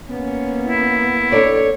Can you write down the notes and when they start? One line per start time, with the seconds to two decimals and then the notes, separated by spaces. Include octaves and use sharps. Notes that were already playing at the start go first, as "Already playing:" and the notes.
0.10 A#3 B3 C#4
0.65 E4
1.32 D4 A4 C#5 D5